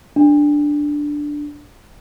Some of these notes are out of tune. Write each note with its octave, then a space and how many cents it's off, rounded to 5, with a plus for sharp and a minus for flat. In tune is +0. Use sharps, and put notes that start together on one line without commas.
D4 +0